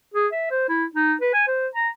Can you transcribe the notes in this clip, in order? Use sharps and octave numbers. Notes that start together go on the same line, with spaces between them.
G#4
E5
C5
E4
D#4
B4
G#5
C5
A#5